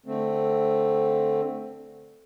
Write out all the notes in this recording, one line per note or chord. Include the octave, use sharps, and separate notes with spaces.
D3 A3 C4